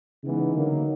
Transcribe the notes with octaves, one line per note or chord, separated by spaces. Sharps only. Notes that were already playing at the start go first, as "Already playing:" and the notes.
C#3 E3 G#3 B3 D#4
D3 F#3 A#3